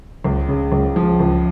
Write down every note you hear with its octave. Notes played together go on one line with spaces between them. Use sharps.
C#2
C#3
C#2
F3
C#2